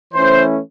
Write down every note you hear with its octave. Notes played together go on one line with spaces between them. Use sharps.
E3 A3 C#4 E4 C5